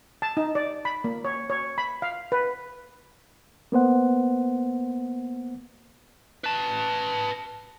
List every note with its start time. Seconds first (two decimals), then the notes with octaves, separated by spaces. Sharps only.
0.22 A5
0.37 D#4
0.55 D5
0.85 B5
1.04 A#3
1.24 C#5
1.50 C#5
1.78 B5
2.02 F5
2.32 B4
3.72 A#3 B3 C5 F#5
6.44 B4 A5